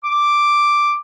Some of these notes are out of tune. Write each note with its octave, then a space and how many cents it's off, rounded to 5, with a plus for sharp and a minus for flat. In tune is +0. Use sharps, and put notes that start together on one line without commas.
D6 +0